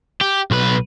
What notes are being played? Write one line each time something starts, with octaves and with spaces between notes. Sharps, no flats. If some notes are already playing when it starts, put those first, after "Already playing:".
G4
B1 B4